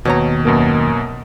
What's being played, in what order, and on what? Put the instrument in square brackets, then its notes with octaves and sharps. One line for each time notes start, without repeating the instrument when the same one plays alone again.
[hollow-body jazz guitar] D#2 C#5 A#5 [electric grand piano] B2
[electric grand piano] F#2 B2 A#3